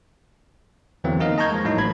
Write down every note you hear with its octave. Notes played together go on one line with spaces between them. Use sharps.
E2 D3 E3 F#3 A#3 C4
A#3 D#4 A#4 D#5 F5
D#5 A5 A#5 C#6 G6 G#6
F3 G#3
A2 F#3 A#3 D#4
A1 B5 G#6